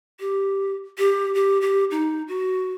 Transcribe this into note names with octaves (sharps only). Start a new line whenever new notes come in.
G4
G4
G4
G4
D#4
F#4